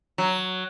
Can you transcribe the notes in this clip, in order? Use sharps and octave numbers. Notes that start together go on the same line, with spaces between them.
F#3